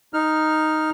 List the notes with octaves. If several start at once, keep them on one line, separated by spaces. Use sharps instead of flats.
D#4 F6